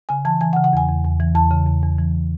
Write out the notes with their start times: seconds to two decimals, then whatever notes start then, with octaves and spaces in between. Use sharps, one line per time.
0.09 C#3 G#5
0.25 E3 A5
0.41 E3 G#5
0.53 F#5
0.56 C#3
0.64 F#5
0.73 E2 G#5
0.88 E2
1.04 E2
1.20 E3
1.35 E2 A5
1.51 C#3
1.67 E2
1.83 E2
1.99 E3